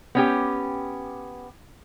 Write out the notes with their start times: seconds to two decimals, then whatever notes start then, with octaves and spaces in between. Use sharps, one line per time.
0.15 B3 C#4 G4